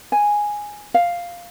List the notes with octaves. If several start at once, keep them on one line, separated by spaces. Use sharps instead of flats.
G#5
F5